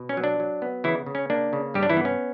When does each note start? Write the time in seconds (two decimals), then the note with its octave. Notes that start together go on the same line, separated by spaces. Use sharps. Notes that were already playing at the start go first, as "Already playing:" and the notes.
Already playing: B2
0.09 C#4
0.17 F#3
0.24 D4
0.40 F#3
0.62 B3
0.84 C#3 E3 E4
1.06 C#3
1.15 C#4
1.30 A#3 D4
1.53 C#3
1.74 G2 G3 G4
1.83 D4
1.90 E3 E4
1.97 B3
2.05 C#4